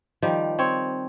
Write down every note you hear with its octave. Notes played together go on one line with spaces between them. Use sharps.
D#3 F3 G3
C4 C#5